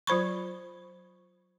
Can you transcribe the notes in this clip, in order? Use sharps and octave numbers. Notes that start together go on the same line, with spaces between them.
F#3 F4 C5 B5 C#6